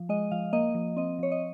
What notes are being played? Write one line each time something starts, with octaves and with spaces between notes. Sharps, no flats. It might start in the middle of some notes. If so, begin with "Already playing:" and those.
Already playing: F3
G#3 D#5
F3 F5
A#3 D#5
F3
C4 D#5
F3 C#5
D#5